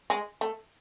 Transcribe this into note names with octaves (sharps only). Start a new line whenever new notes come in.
G#3
A3